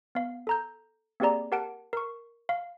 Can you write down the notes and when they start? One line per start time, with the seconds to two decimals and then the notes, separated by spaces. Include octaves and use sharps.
0.15 B3 F5
0.47 A4 A#5 G6
1.20 A#3 C4 G4 G#4 D5 A#5
1.52 G4 A#4 F#5 A5 D7
1.93 A#4 C#6
2.49 F5